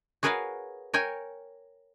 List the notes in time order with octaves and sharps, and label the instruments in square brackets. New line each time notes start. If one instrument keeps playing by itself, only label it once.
[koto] F#4 G#4 A#4 B4 C#5 F5
A#4 C#5 G5 G#5